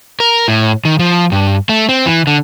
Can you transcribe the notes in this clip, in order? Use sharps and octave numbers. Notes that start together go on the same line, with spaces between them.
A#4
A2
D#3
F3
G2
A3
C4
E3
D3